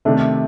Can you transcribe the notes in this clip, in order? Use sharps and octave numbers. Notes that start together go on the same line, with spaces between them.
C3 D#3 A3 D4